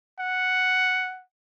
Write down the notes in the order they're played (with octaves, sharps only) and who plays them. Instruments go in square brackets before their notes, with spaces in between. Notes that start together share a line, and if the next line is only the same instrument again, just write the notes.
[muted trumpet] F#5